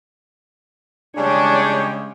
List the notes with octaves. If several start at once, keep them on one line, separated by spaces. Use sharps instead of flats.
C#3 G3 G#3 D4 C#5 G5